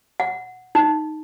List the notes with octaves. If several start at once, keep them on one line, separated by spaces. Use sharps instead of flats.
F#5
D#4